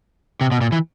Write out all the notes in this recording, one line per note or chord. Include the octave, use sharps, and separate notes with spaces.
C3
B2
A#2
E3